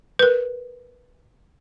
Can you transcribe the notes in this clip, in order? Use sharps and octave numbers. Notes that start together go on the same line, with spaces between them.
A#4 B4